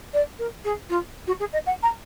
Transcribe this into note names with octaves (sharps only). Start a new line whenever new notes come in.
D5
A#4
G#4
F4
F#4
G#4
D#5
F#5
A#5